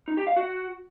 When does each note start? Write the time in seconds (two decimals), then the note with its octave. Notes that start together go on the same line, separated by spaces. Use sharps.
0.08 D#4
0.17 G4
0.27 F5
0.36 F#4